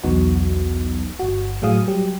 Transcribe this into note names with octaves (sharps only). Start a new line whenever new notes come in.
B1 E2 F#3 B3 D#4 F#4
G1 F#4
A2 F#3 G#4 F5 D#6
F#3 G3 G4